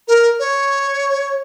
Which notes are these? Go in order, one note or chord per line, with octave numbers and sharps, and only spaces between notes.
A#4
C#5